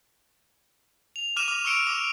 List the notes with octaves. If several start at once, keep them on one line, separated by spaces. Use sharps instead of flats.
F7
D6 F6 D#7 E7
D6 F6
C#6 E6 F6 C#7 D7 E7
D6